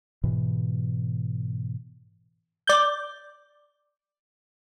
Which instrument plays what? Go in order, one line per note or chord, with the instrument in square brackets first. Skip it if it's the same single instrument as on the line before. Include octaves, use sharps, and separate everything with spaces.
[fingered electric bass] G#2 B2 E3
[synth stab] D5 G6